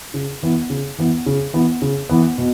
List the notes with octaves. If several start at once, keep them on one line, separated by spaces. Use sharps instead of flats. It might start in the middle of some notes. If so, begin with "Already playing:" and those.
C#3
E3 B3
C#3
E3 B3
C#3
E3 B3
C#3
E3 B3
B2